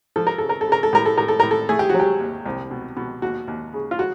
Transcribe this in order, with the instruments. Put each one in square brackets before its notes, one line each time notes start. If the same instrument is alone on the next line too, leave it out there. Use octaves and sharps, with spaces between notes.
[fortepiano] F3 A4
A#4
C#3 A4
A#4
A4
C#3
A#4
A4
A2 A#4
A4
A2 A#4
A4
A2 A#4
A4
A3 G#4
G4
F#3 F#4
G4
D#2
C2
B2
B2
D#2 F#4
D#2
C#3
F4
F#4